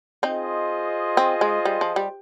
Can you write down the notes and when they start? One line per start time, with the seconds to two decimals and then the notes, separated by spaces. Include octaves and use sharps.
0.23 C4 D#4 F4 G#4 C5 D#5
1.17 C4
1.41 G#3
1.65 G3
1.81 F3
1.96 G3